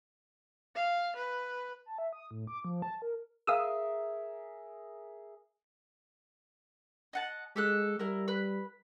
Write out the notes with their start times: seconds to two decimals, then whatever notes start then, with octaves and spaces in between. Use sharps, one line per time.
0.75 F5
1.16 B4
1.86 A5
1.98 E5
2.13 D#6
2.31 A2
2.47 D6
2.65 F3
2.82 A5
3.02 A#4
3.47 G#4 A#4 E5 F5 D#6 E6
7.13 D#5 F#5 A5
7.56 G#3 G4 A4 F#6
7.99 G3 E4 A#4
8.28 B4